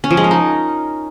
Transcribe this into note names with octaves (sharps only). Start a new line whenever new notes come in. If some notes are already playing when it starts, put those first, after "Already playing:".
C#4
F3
G#3
A#4
D#4